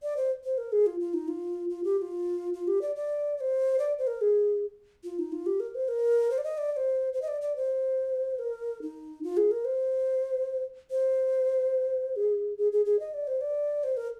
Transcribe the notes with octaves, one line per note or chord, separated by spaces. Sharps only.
D5
C5
C5
A#4
G#4
F4
F4
D#4
F4
F4
G4
G4
F4
F4
G4
D5
D5
D5
C5
D5
C5
A#4
G#4
F4
D#4
F4
G4
A#4
C5
A#4
C5
D5
D#5
D5
D5
C5
C5
D#5
D5
D5
C5
A#4
D#4
F4
G#4
A#4
C5
C5
G#4
G#4
G#4
G#4
D#5
D5
C5
D5
C5
A#4